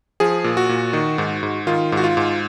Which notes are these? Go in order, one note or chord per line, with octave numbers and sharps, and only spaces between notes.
F3 G#4
A#2
F#4
A#2
D#3
G#2
G#2
D#3 F4
G#2
F#4
F4
G#2